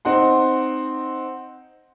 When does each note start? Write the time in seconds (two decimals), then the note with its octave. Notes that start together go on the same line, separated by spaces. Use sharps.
0.05 C4 D#4 F#5 C6